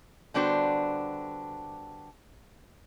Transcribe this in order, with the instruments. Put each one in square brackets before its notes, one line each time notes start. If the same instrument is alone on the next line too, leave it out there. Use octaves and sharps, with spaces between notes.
[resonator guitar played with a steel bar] D3 G3 B3 D4 F#4 C5